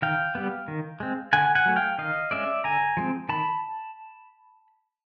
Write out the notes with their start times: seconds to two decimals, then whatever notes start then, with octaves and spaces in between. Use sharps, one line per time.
0.02 D#3 F5 G5
0.35 G3 B3
0.68 D#3
1.00 G#3 C4
1.33 D3 F#5 G#5
1.55 F#5 G#5
1.66 F#3 A3
1.76 F5 G5
1.98 D#3 D#5 F5
2.31 G#3 C#4 D5 E5
2.64 D3 G#5 A#5
2.97 F3 G#3 C4
3.29 D#3 A5 B5